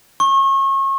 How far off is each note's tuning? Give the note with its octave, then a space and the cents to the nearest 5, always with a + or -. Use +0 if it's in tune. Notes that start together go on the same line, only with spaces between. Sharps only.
C#6 -35